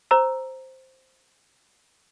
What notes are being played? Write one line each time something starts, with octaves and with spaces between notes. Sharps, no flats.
C5 A#5 E6